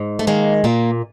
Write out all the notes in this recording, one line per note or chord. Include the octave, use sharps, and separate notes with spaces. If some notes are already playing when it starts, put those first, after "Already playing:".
Already playing: G#2
A3
D#3 G#3 A#3
A#2 A#3